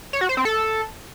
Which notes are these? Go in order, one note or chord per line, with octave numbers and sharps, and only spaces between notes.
C#5
F#4
C5
C4
A4